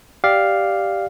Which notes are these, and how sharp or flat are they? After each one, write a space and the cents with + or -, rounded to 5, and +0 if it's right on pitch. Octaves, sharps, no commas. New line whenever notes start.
G4 +0 D5 +0 F5 +0